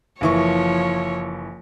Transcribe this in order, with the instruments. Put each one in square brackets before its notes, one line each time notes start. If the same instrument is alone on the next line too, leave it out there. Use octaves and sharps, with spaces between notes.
[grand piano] F#1 E3 C#6 [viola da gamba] F3 C#5